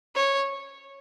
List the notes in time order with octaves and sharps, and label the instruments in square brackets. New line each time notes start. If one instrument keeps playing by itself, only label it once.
[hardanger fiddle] C#5